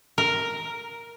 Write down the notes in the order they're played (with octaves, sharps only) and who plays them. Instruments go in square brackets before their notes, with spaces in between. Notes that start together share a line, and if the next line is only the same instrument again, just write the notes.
[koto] A#4